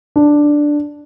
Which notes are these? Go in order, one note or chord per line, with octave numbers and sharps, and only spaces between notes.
D4